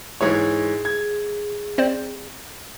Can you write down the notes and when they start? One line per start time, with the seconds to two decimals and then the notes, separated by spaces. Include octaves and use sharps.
0.21 G#2 E3 G#4 C#5
0.85 G#6
1.78 C4 C5 D5